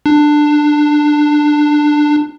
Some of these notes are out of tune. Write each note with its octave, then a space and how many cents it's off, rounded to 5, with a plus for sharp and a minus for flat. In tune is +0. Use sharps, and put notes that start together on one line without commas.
D4 +15